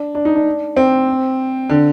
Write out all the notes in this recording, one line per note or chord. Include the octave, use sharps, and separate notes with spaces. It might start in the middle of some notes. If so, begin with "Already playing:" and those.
Already playing: D4
D4
D#4
D4
C4
D3